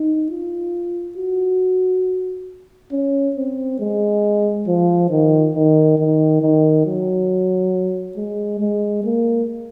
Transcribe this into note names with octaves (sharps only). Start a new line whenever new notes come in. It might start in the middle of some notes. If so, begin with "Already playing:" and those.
Already playing: D#4
F4
F#4
C#4
C4
G#3
F3
D#3
D#3
D#3
D#3
F#3
G#3
G#3
A#3